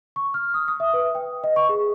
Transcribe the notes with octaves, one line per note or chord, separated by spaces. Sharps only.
C#6
F6
D#6
D#6
E5
B4
G5
D#5
C#6
G#4